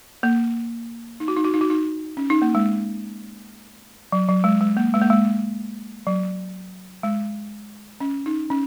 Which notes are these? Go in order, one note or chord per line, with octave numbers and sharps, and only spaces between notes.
A#3
D#4
F#4
D#4
F#4
D#4
F#4
D#4
C#4
D#4
A#3
G#3
F#3
F#3
G#3
G#3
A#3
G#3
A#3
G#3
F#3
G#3
C#4
D#4
C#4